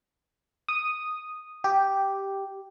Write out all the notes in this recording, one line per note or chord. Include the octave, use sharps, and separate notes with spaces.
D#6
G4